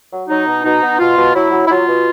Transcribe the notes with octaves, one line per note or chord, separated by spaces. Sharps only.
F#3
F#3 D#4
B2
B2 D#4
B3
B2 F4
B2
F#3 E4
F#3
E4
F#3 F4
B2